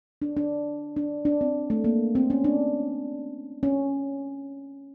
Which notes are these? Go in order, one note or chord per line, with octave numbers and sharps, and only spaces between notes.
D4
D4
D4
D4
C4
A3
A#3
C4
C#4
D4
C#4